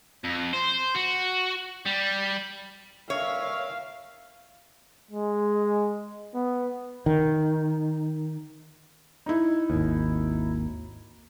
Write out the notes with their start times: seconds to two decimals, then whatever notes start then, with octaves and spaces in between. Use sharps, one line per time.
0.24 F2
0.54 C5
0.95 F#4
1.86 G3
3.10 G2 A#4 C#5 E5 F5
5.11 G#3
6.35 B3
7.06 D#3
9.26 D#4 E4
9.70 G#1 D#2